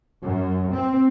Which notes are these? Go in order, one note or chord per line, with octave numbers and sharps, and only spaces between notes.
F#2
C4